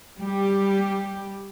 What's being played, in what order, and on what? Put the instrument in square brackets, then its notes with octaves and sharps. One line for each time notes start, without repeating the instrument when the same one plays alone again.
[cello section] G3 G4